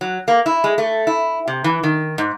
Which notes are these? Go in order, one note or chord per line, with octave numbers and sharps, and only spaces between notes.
F#3
A#3
E4
G#3
A3
E4
C3
E3
D#3
G#2